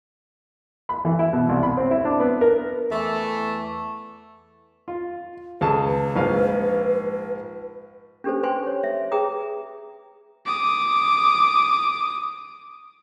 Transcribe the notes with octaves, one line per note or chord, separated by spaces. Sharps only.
B5
E3
E4
B2
C2
B5
C4
E4
D4
B3
A#4
E2 E3 A3
F4
C#2 G#4 A4 A5
B4
A#1 G#2 F5
C#4 D4 G4 A4 B4 C5
B4 C5 G5 G#5 C6
C#5
E5
G#4 B4 E5 G5 A#5 D#6
D6 D#6